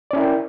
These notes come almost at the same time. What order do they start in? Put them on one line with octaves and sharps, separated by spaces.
D5 C#4 E4 A#4 G5